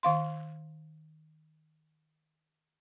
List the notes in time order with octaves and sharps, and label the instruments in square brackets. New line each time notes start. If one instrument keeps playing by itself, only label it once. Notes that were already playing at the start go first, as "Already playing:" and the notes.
[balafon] D#3 F5 C6